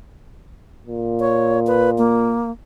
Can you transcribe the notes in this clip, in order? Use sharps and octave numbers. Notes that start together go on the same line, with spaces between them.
A#2
C#5
B4
A#3